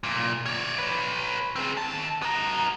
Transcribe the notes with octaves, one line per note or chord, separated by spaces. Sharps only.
B1 A#2
C#5 D5
B4 C#5
C4 G#4
D#3 A5
B3 A#5